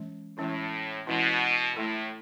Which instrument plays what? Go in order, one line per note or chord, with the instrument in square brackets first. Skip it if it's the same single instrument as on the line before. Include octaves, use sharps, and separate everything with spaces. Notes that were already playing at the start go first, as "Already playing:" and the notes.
Already playing: [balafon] E3 G#3 C#4
[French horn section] A2 [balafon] E3 G#3 C#4 E4
[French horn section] B2 [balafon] E3 G#3 C#4 E4
[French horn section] A2 [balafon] A3 E4 A4